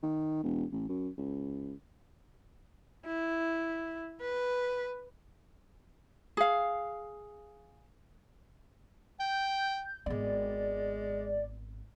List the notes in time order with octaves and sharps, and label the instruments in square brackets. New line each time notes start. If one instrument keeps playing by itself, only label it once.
[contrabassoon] D#3
E1
A1
F#2
C#2
[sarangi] E4
B4
[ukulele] G#4 F5
[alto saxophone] G5 [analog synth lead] G6
[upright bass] G#1 B3 [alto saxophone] G#3 [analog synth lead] D5